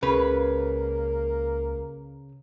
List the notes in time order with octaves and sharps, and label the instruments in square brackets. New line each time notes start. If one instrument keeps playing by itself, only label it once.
[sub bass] C#2 [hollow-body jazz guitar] C#3 [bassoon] A#3 [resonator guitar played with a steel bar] B4